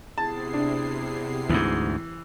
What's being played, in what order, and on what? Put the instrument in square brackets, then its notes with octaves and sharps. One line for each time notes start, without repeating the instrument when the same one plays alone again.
[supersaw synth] C3 C7 [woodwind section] B3 E4 G#4 [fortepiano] A5
[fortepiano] D4
[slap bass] D2 G#2 [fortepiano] E3